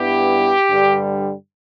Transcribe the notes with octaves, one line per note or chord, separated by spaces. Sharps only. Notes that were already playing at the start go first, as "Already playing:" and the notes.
Already playing: G2 G3 B3 E4 G4
G2 D3 G3